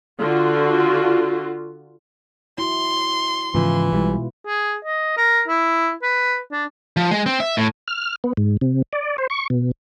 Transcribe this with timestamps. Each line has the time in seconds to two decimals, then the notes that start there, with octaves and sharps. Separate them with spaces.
0.19 D3 F4 F#4
2.58 E4 F#4 C6
3.55 G#2 C#3 E3 F3 F4 B4
3.92 B1 B2 G3 G#3 E4
4.47 G#4
4.85 D#5
5.17 A#4
5.48 E4
6.03 B4
6.52 D4
6.97 F3
7.11 G#3
7.26 C4
7.40 E5
7.57 A2
7.88 F6
8.24 B3
8.37 G#2
8.61 C3
8.93 D5
9.18 C5
9.30 C#6
9.50 B2